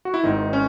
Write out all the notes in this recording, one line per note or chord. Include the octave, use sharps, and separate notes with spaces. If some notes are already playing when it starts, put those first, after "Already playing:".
F#4
E4
G#1 G#2 D#3 D#4
C#4